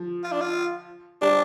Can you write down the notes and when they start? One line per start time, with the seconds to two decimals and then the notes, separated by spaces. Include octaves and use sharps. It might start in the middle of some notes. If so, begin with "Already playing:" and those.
Already playing: F3
0.24 F4
0.32 D4
0.41 F4
1.22 G3 D4